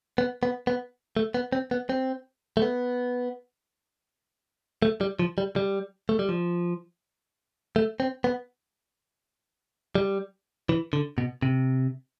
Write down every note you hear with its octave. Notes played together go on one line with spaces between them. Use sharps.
B3
B3
B3
A3
B3
C4
B3
C4
A3
B3
A3
G3
F3
G3
G3
A3
G3
F3
A3
C4
B3
G3
E3
D3
B2
C3